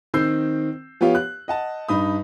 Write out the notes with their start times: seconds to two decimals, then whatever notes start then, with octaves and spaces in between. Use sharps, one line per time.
0.14 D#3 C4 E6 G6 C7
1.01 F3 B3 F4 G4 C#5 F5
1.15 F#6
1.48 D#5 F#5 A5
1.89 G2 D#4 B5 D#6